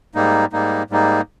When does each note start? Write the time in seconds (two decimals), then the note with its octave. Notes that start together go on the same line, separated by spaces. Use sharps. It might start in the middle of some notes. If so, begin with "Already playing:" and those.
0.15 G#2 G3 A#3 D#4
0.53 G#2 G3 A#3 D#4
0.90 G#2 G3 A#3 D#4